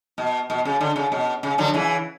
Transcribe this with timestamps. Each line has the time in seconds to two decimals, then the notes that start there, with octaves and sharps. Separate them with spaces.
0.18 B2
0.50 B2
0.65 C#3
0.81 D3
0.96 C#3
1.12 B2
1.43 C#3
1.58 D3 F#3
1.74 C#3 E3